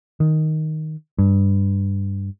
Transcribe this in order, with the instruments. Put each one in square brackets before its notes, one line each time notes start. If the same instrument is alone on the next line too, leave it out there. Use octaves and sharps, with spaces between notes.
[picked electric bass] D#3
G2